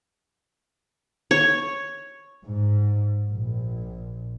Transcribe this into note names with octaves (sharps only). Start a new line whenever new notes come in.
C#5
G#2
A#1